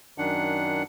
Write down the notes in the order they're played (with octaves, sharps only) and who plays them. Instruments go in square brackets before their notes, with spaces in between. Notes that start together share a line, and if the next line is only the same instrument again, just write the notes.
[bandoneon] F#2 D#3 D4 F#5